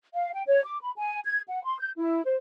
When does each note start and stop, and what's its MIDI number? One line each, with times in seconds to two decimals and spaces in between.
0.13 0.34 77
0.34 0.42 79
0.47 0.60 73
0.65 0.80 86
0.81 0.91 83
0.98 1.19 80
1.25 1.41 92
1.48 1.63 78
1.64 1.79 84
1.79 1.91 91
1.98 2.22 64
2.25 2.36 72